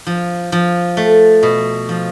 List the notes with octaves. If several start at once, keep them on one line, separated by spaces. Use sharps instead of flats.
F3
F3
A3
B2
F3